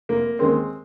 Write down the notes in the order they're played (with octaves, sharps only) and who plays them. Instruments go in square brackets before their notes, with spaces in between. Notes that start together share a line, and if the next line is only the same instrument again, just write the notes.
[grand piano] F1 [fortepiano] A#3
[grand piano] D#2 D#3 A#3 C#4 [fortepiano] G#3 C4